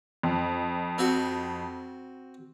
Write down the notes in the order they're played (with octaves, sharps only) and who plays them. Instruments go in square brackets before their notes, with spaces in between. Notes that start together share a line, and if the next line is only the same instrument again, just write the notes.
[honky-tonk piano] F2
[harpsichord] C4 F#4